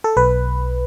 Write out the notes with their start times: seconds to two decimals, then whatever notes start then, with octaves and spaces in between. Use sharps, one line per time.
0.04 A4
0.17 B1 B4